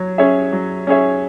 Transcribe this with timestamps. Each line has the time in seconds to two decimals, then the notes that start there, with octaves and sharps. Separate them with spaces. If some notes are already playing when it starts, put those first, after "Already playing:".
Already playing: F#3 C#5
0.18 C#4 G#4 C#5 E5
0.53 F#3
0.87 C#4 G#4 C#5 E5